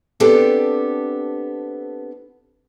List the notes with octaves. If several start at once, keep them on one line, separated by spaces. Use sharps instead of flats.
B3 C4 D4 G4 A4